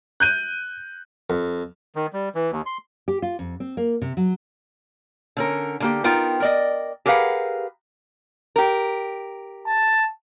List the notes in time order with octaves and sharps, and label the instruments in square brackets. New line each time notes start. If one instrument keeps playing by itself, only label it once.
[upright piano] F#6 G6 D#7
[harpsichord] F2
[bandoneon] D#3
G3
E3
D#2
C6
[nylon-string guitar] G4
F4
F2
C4
A#3
C3
F#3
[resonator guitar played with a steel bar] D3 C#4 A#4
D3 A#3 G4
B3 D#4 F4 A#4 G5
A#4 D5 D#5
G4 G#4 A#4 B4 F5 F#5
G4 A#4
[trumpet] A5